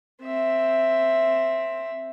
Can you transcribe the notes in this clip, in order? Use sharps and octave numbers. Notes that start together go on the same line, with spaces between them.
C4 E5